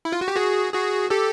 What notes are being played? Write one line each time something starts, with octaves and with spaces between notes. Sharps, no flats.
E4
F4
F#4
G4
F#4 G#4
F#4 G#4
G4 A4